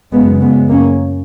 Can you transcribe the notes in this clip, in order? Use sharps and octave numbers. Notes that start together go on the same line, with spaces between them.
F#2 C#3 G#3 B3
G#3 B3
A#3 C#4